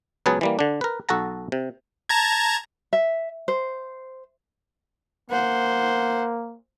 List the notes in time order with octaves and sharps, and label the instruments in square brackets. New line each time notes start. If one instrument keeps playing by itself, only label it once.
[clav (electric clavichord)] C#2 F#3 B3 G#4 B4 A5
E3 G3 A#3
D3 D4
A#4 B4
B1 F#4 A4 F#5 A5 A#5
C3
[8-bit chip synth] A5 A#5 G#6
[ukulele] E5
C5
[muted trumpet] A#3 [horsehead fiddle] C5 F#5